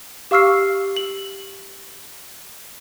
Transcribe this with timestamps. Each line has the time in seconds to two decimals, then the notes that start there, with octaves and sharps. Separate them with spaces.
0.31 G4 F5 C#6 E6 F6 C7
0.97 F#7